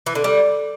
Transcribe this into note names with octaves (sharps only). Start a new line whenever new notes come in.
E3
D3
G3